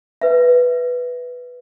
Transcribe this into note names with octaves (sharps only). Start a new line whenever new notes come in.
B4 E5